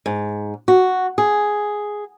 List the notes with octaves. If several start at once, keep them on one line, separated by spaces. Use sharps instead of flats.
G#2
F#4
G#4